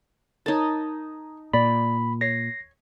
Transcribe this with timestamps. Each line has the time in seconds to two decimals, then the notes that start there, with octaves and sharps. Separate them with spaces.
0.46 D#4 A#4 C#5 A5
1.53 A#2 D5 B5
2.21 C#5 A#6 C7